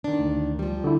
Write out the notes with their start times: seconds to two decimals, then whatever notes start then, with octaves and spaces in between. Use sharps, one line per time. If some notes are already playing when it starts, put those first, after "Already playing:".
0.04 D#3 D4
0.19 D2
0.59 F3 G3
0.84 D3 E4